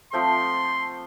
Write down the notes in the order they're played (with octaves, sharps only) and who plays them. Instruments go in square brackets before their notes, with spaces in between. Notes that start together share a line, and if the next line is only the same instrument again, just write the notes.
[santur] F3 A3 C4 [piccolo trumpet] C6